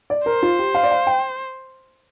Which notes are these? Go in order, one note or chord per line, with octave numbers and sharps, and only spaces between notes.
D5
A#4 C5
F4
G4
F5
D5
F5
G5